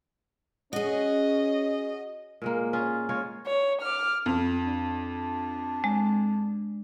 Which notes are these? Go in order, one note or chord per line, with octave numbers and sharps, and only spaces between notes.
C#4 F#4 G#4 D#5
A#2 G#3 A#3
C#4 F4 G#4
G#3 F4 C#5 F5
C#5
D6 F6
F2
D4
G#3